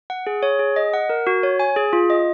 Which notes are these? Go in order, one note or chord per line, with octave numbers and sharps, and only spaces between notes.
F#5
G#4
C#5
G#4
D#5
F#5
A#4
F#4
C#5
G#5
G#4
F4
D#5